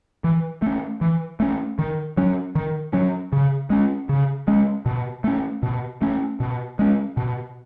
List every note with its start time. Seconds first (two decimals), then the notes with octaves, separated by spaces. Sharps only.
0.24 E3
0.62 A3 C#4
1.01 E3
1.40 A3 C#4
1.79 D#3
2.17 F#3 C#4
2.55 D#3
2.93 F#3 C#4
3.33 C#3
3.70 G#3 C#4
4.09 C#3
4.48 G#3 C#4
4.86 B2
5.24 A3 C#4
5.63 B2
6.02 A3 C#4
6.40 B2
6.79 G#3 C#4
7.17 B2